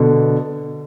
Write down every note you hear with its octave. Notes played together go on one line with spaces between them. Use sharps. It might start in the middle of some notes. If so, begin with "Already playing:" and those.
Already playing: B2 D3